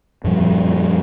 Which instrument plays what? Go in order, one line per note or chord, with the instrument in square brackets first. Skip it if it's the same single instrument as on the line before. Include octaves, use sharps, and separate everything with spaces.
[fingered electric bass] F#2 A#2 F3 G3